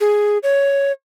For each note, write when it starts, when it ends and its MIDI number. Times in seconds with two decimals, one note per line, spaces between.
0.01 0.38 68
0.43 0.92 73